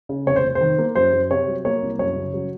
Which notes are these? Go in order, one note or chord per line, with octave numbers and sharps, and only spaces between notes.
C#3
F1 C#5
C5
F1
C5
D#3
A#3
F#2 C5
F#2
C3 C#5
F#3
A#3 C#5
C2
F#2 C#5
C#3
F#3